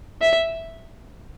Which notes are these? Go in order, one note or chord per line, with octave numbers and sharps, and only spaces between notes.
E5